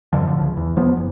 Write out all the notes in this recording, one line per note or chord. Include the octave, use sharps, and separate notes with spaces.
F#2 D3 F3
F1 A2 D3 F3
C#2
E2
D#1 F3 B3
F#1